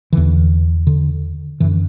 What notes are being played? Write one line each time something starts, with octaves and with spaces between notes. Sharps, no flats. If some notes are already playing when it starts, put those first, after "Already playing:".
E2 D3 E3
D3
F#2 D3 E3